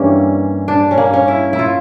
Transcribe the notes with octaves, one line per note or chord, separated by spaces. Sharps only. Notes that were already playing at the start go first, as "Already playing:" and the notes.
Already playing: G2 E3 G3 A#3 C#4
D4
C#4
A#3
C#4
E4
E4
F4